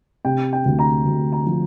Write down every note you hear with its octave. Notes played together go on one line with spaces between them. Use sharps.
C3 G5
G5
D2
A#5
D2
A#5
F3